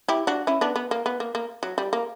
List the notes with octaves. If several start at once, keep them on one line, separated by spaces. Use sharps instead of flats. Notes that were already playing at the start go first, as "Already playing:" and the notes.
E4 G4
D4 F#4
C#4 E4
B3 D4
B3
A#3
B3
A#3
A#3
F#3
G3
A#3